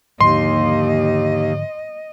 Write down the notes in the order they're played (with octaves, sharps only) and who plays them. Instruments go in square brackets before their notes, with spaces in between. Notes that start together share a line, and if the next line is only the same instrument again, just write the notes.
[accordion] D#2 [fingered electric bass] G#2 D3 F3 [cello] D#5 [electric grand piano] C6